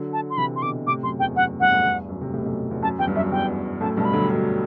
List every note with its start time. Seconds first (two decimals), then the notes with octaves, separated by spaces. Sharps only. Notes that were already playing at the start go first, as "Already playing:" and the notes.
Already playing: D3 F#3
0.13 A5
0.30 C6
0.37 C3 E3 B5
0.56 C6
0.62 B2 D3 D6
0.86 A2 C3 D6
1.03 F#2 C6
1.19 E2 G5
1.35 F#2 F#5
1.48 F#2
1.60 E2 G2 F#5
1.72 F#2 A2
1.84 E2 G2
2.09 F#2
2.21 A2 C3
2.33 A2 C3
2.40 B2
2.45 F#2 A2
2.71 E2
2.83 F#2 A5
2.99 E2 G5
3.08 G2
3.15 F#2 E5
3.31 E2 G2 G5
3.81 F#2 A2 A5
3.97 G2 B2 A5
4.05 B5
4.13 D3 F#3
4.22 G3
4.30 D3 F#3